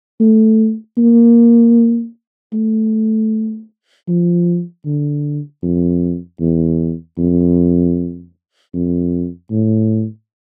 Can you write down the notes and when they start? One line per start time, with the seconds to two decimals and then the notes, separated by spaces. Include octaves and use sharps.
0.20 A3
0.98 A#3
2.53 A3
4.08 F3
4.85 D3
5.63 F2
6.40 E2
7.18 F2
8.74 F2
9.51 A2